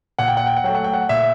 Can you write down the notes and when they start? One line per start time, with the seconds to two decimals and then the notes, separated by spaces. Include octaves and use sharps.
0.19 A#2 F#5
0.28 G5
0.37 F#5
0.47 G5
0.56 F#5
0.64 F#3 A3 G5
0.75 F#5
0.84 G5
0.93 F#5
1.09 A#2 E5